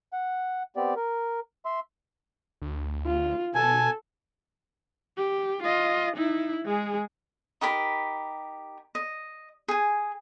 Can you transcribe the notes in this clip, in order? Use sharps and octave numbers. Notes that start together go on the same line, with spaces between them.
F#5
B3 C4 G4 D5
A#4
E5 C6
D2
F4
B2 A4 G#5 A5
G4
F4 D#5
D#4 E4
G#3 G#4
D#4 G4 A#4 B5
D#5
G#4 G#5